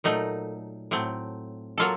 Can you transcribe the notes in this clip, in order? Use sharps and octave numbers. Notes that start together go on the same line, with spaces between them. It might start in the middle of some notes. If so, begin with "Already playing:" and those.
A#2 F#3 A3 D#4
A2 F#3 A3 C4
F#3 A#3 F4 A4